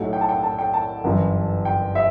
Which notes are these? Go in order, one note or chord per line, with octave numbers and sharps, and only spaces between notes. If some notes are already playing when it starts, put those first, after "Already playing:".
Already playing: B1 A2 F#3 A3 F#5
G5
A5
G5
A5
G5
A5
G1 F#2 E3
G5
E5